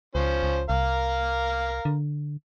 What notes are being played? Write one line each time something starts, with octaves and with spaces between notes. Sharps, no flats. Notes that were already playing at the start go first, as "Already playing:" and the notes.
C#2 F3 C#4 C5
C#2
C2 A#4 F5
D3